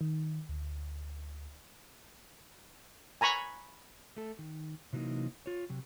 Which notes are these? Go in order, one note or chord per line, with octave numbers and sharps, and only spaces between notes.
D#3
D2
G#5 A#5 B5 C#6
A3 A4
D#3
C3 E3 F#3 A#3 D#4
F4 C#5
C3 F#3